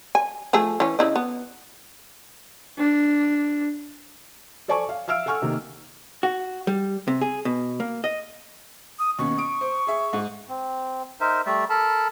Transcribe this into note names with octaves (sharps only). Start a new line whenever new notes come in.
G#5
F3 A3 G#4
E3 C#4
C#3 E4 D#5
B3
D4
A4 C5 D5 G#5 A5 C#6
F5
E5 F5 E6 F6 D7
A4 F#5 G#5 C#6 F6
C3 D#3 A#3 D#4
F#4
G3
C3
G#4
B2
A#3
D#5
D#6
D#2 B2 C#4 C#6
D#6 D7
C5
G#4 E5
G#2
C4
D#4 A#4 C5 E5
G3 A3 D5 E5
A4 A#4 A5 B5